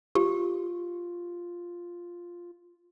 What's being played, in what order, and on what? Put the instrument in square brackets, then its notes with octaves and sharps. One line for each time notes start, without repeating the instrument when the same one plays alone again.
[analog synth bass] F4 [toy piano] G4